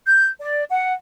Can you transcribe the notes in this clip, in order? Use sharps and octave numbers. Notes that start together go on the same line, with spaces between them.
G6
D5
F#5